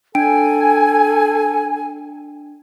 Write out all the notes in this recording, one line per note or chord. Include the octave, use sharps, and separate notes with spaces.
D4 A4 G5 G#5 D7